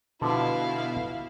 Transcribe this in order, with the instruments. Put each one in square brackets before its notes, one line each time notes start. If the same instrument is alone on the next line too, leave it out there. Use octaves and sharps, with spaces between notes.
[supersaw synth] B2 [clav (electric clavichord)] D3 F3 [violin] E4 F5